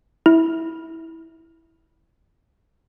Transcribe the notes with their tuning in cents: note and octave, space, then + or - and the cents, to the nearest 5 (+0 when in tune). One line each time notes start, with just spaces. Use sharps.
E4 -15